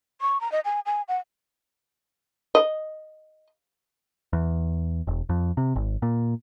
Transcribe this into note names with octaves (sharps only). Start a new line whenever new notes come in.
C#6
A#5
D#5
G#5
G#5
F#5
D#5
E2
E1
F2
C3
G#1
A#2